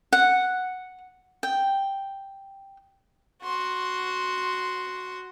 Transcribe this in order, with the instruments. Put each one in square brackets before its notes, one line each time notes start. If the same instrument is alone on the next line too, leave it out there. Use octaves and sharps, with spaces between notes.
[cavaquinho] F#5
G5
[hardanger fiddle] F#4 C6